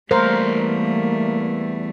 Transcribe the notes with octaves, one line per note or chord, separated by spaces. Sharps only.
E2 G3 A3 A#3 A#4 C5 F5